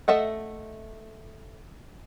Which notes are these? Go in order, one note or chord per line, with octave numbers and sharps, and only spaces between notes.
A3 A4 D#5 E5 F#5